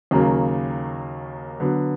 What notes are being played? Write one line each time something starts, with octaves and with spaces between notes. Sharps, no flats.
D#2 C#3 F#3 A#3
D3 F#3 B3